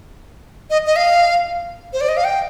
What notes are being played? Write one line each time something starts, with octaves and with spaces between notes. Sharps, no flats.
D#5
D#5
F5
C5
D5
D#5
F5
G5